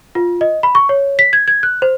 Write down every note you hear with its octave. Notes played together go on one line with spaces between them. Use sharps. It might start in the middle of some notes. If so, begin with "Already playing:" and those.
F4
D#5
B5
C#6
C#5
B6
G#6
G#6
F#6
C5